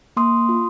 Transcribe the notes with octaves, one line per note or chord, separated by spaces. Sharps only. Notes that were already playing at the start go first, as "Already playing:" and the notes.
A#3 C6 D#6
F4